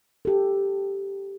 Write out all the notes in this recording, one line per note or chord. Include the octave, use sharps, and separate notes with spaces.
G4 A4